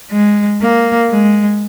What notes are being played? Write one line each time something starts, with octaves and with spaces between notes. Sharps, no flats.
G#3
A#3
G#3